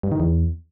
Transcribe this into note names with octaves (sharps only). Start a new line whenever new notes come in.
G2
D#3
E2